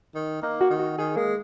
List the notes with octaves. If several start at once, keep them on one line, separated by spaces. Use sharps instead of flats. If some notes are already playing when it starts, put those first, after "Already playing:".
D#3
A#3 D#4
F#4
D#3
F#4
D#3 G#4
G#3 A#3